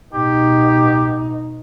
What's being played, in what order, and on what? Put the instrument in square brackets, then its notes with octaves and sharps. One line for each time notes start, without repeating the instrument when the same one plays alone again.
[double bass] B2 D#4 [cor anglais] G4